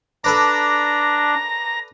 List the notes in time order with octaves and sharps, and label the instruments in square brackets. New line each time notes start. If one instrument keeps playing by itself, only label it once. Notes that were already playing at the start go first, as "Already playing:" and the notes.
[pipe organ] D4 [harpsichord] A4 B4 D5 [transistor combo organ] A#5